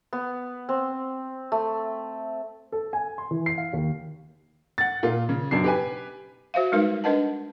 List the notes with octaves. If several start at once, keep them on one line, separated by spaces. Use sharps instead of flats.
B3
C4
A3
A4
G#5
C6
E3
C7
F5
D#2
F#5 A6
A#2 F4
C#3
F#2 B2 D4 C7
G4 B4 G#5
F#4 C5 E5 F5
G3 G#3 D#4 A#4 B4
D4 A#4 B4 D#5 F#5 A5